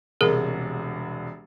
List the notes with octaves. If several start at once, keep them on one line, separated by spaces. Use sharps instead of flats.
E1 C2 G#4 A#4